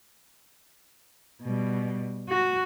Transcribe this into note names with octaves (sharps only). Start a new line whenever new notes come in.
B2 G3
F#4